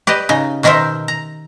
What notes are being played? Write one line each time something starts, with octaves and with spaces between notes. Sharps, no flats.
G4 B4 D5 D#5
C#3 D#4
B2 D#3 D#4 A#4 C5 E5
A#5